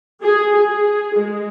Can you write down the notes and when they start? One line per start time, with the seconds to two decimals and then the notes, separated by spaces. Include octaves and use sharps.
0.22 G#4
0.55 G#4
1.16 G#3